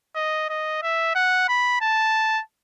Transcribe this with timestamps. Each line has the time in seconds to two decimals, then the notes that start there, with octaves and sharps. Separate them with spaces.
0.16 D#5
0.49 D#5
0.82 E5
1.15 F#5
1.49 B5
1.81 A5